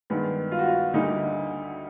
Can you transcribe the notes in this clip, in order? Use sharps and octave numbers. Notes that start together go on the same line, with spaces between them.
G2 D#3 G#3 B3
F4
F#4
F4
D2 D3 G3 A#3 D#4